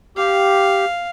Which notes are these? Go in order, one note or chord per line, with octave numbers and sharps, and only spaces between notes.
G4 F5